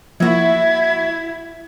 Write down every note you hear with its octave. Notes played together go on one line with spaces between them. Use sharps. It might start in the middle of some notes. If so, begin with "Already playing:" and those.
F3 A#3 E4 F#4 E5 G#6